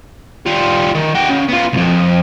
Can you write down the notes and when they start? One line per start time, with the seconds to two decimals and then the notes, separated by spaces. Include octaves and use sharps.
0.46 G3 F4
0.95 D#3
1.15 F#4 G5
1.29 C#3
1.48 B3 F4
1.73 C2 F2